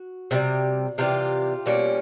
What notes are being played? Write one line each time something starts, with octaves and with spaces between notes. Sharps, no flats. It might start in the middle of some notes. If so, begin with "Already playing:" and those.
Already playing: F#4
C3 E3 G3
C3 E3 G3 F4 G4
B2 G3 A#3 C#4